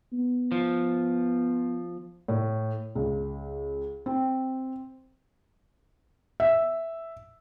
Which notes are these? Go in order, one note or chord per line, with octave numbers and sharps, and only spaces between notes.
B3
F3
A2
C#2
C4
E5